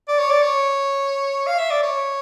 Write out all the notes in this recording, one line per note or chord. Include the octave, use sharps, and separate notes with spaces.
D5
C#5
D5
C#5
F5
E5
D5
C#5